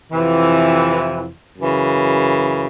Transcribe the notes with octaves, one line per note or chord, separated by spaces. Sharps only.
F2 C3 E3
F#2 C#3 E3